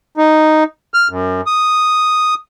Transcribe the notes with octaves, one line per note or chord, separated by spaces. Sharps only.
D#4
F6
F#2
D#6